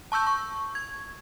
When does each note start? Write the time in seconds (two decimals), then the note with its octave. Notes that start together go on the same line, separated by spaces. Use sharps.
0.12 A5 C#6 E6 G6
0.27 C#6
0.75 G#6